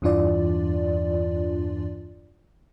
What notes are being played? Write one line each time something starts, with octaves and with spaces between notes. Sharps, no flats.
E2 G2 E3 D4 F4 D5